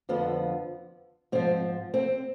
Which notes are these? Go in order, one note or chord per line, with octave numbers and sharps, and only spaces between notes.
F2 D3 F3 B3
G#2 F3 C4
C4